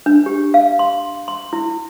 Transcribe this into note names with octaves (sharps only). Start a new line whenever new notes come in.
D4
G4
F5
C6
C6
E4